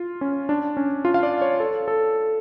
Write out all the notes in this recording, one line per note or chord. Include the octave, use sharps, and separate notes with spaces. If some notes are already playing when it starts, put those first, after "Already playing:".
Already playing: F4
C#4
D4
C#4
F4
F5
D5
C#5
A4
A4